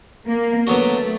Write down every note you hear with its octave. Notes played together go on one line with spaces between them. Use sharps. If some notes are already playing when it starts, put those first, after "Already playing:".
A#3
D3 F#3 A3 B3 D4 F#4